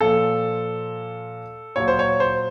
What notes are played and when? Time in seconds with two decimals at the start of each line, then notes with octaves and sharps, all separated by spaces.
0.01 A#2 F3 A4
1.76 A#2 F#3 C#5
1.88 C5
1.99 C#5
2.20 C5